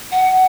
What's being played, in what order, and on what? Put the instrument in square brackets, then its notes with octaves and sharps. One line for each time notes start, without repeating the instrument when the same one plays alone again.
[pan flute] F#5